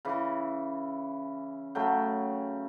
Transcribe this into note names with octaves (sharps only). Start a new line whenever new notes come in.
C#3 E3
C#3 F#3 A3 G5